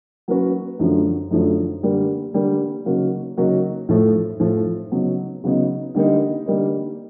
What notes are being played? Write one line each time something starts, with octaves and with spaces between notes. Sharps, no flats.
F#3 A#3 C#4 F#4 B4
F#2 D3 F3 A3 D4
F#2 D3 F3 A3 D4
D3 G3 A#3
D3 G3 A#3
C#3 F#3 A#3 D#4 F#4
C#3 F#3 A#3 D#4 F#4
A2 F3 A3
A2 F3 A3
C#3 F#3 B3 D#4
C#3 F#3 B3 D#4
D3 G3 A#3 D#4
D3 G3 A#3 D#4